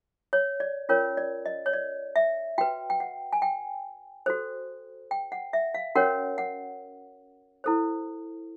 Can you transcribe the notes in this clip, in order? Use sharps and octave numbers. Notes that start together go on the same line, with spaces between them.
C#5
D5
C#4 F4 A#4 C#5
D5
D#5
C#5
D5
E5
F#4 B4 G5
G5
F#5
G#5
G5
F#4 A4 C5
G5
F#5
E5
F5
C#4 F#4 A#4 C#5 F#5
F#5
E4 A4 C5